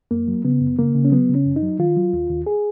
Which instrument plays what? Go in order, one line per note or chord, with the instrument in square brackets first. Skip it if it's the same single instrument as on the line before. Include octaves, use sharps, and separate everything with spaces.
[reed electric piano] F#2 A#3
F#3
C#3 B3
F#2
C#3 A#3
C#3
C#4
F#3 B3
C#3
C#4
F#2
D#4
F#3
D#3 F4
F#3
D#2
D#2
G#4